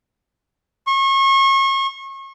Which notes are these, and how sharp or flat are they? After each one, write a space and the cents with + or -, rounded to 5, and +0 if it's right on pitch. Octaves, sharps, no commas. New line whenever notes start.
C#6 -35